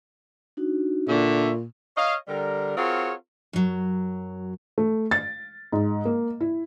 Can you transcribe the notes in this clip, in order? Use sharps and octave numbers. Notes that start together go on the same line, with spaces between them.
D4 D#4 F#4
A#2 D3 E5 C#6
C#5 D#5 F5
D3 G3 A#4
C4 F4 F#4 G#4 A#4 C#5
F#2 F#3
A3
A6
G#2
A#3
E4